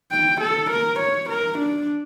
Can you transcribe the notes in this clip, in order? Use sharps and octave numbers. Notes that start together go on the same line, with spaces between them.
G5
A4
A#4
C#5
A#4
D4